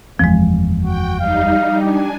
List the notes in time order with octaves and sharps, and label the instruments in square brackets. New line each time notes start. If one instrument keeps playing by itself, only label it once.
[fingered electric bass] F#1 E2 C4 [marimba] F3 G#3
[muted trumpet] F#4 [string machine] G5
[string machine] G3 D#4 [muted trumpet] F5
[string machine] D4 G#5 [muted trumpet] G4